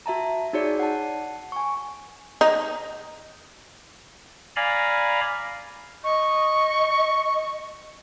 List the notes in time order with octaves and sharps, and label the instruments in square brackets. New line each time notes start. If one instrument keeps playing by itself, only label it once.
[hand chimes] F#4 E5 A5 A#5
D#4 F#4 G#4 C#5 D5 C#7
F#5 A5
G#5 C#6
[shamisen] D#4
[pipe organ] D5 F5 G#5 A#5 B5
[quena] D#5 [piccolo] C#6